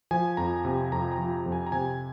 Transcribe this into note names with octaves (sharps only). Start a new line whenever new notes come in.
F3 G#5
F2 A#5
C3 G#5
F2 A#5
A#5
F3
A#5
F2
G#5
A#5
C3 G#5